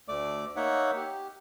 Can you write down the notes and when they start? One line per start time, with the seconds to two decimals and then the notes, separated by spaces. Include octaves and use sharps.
0.08 D2 A3 D5 D6
0.56 A#3 D#4 C#5 E5 F#5
0.96 G4